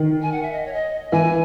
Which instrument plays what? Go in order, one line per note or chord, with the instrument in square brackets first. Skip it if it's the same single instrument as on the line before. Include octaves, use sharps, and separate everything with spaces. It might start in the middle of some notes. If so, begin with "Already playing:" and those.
Already playing: [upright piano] D#3
[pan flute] G#5
F#5
E5
D#5
C#5
D#5
[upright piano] E3 [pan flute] G#5